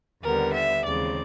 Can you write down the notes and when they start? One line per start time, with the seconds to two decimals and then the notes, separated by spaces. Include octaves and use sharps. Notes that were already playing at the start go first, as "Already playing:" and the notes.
0.21 D#2 D3 G3 B3 A#4
0.53 E5
0.84 D#2 C#3 E3 G#3 C4 D5